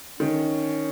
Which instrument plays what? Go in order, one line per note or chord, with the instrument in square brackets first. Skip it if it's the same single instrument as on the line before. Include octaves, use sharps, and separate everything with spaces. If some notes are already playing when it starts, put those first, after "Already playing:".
[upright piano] D#3 [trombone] C#4